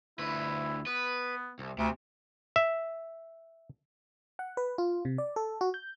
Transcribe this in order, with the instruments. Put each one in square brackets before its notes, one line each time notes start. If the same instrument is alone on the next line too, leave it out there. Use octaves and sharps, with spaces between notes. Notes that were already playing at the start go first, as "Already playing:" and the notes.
[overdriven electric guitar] D2 B4 [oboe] E4
[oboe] B3 [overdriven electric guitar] B4
[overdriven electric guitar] C2
[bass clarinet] D2 [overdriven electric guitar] C3
[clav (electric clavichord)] E5
[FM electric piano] F#5
B4
F4
C3
D5
A4
F#4
G6